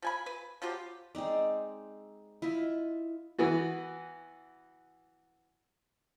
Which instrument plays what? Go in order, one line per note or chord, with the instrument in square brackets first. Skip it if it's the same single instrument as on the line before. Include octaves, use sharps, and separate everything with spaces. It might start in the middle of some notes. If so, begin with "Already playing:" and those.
[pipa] F3 G#5 B5
B4
F3 F#3 F4 G4
[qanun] G#3 C4 D#4 D5
E4 F4 D#5 E5
[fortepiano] E3 B3 F#4